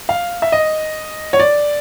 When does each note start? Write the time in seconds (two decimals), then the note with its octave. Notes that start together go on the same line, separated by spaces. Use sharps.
0.09 F5
0.42 E5
0.52 D#5
1.33 C#5
1.40 D5